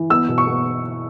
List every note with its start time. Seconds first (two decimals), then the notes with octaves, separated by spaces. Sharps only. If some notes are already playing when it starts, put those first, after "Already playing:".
Already playing: E3
0.10 B3 E6
0.29 B2
0.38 C#6
0.47 B3